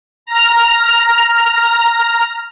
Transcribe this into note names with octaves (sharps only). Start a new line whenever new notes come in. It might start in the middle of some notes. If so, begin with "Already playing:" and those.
A#5 F6